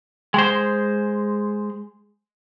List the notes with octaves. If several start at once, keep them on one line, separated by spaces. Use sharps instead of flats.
G#3 C5